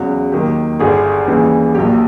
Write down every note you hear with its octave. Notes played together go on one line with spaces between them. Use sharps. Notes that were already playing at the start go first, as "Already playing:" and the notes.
Already playing: E2 C#3 F#3 F#4
D#2 D#3 F#3 G4
G1 G2 D3 G#4
D#2 C#3 E3 G3
A#1 A#2 F#3 G4